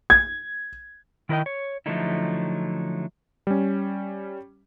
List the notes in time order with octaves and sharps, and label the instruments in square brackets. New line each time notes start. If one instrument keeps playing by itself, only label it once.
[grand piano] G#6
[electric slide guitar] D#3 E4 A#4 B4 D#5 G5
C#5
D3 F3 F#3 A3 D#4 E4
[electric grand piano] G3 C#4